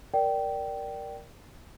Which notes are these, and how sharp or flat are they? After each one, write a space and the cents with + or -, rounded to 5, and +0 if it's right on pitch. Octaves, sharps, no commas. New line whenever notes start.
A#4 +0 D5 +0 G5 -15